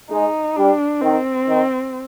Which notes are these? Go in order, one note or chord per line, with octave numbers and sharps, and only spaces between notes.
G#3 D#4
G3 D4
D#3 C4
D#3